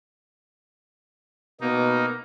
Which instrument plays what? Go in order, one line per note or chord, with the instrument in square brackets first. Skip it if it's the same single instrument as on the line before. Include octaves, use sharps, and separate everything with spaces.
[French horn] B2 [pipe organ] A#3 D#4 [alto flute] B3